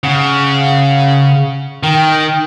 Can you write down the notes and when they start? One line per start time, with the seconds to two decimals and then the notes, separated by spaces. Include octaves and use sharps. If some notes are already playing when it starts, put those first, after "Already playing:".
0.03 C#3 F#5
1.83 D#3 G5